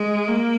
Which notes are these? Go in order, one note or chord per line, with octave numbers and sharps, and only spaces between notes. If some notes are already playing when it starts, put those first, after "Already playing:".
Already playing: G#3
A#3